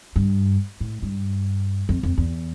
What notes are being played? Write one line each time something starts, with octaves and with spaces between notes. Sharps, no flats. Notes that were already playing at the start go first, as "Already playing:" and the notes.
G2
A2
G2
F2
F2
E2